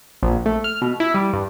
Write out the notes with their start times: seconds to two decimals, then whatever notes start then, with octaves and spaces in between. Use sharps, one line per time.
0.23 A#1
0.46 A3
0.64 F6
0.82 B2
1.00 E4
1.14 G3
1.33 G2